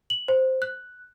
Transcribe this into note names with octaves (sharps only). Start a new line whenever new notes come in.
F#7
C5
F#6